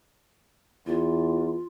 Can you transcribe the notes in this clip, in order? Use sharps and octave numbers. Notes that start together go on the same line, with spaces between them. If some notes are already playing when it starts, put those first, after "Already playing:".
E2 F4